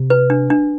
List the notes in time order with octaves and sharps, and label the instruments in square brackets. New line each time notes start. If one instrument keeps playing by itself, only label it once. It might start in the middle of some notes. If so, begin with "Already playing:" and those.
Already playing: [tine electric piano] C3
[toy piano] B4
D4
D4